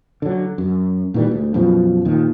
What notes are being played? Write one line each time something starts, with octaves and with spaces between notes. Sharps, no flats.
D3 F#3
F#2
A#2 D#3 E3 G3
D2
F#2 B2 F3
D#2 A#2 D#3